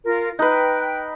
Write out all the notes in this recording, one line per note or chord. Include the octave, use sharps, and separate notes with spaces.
F4 A#4
D#4 B4 G5 F#6